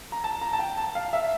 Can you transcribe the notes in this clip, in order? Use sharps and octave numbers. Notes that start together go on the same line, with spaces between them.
A#5
A5
A#5
A5
G5
A5
F5
E5